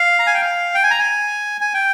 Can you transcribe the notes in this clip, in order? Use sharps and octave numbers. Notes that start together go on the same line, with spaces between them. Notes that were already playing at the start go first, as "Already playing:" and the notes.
Already playing: F5
A#5
G#5
G5
F5
G5
G#5
A#5
G#5
G#5
G5